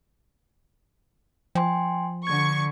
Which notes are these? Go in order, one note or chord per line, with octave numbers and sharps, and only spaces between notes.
F3 G5 G#5 C6
D3 C#6 G#6